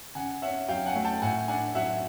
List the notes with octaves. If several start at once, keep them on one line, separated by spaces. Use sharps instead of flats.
C#3 F#5 G#5
C#4 E5 F#5
F#3 F5 G5
F#5 G#5
A3
G5 A5
A2 F#5 G#5
D4 F#5 G#5
F#3 E5 F#5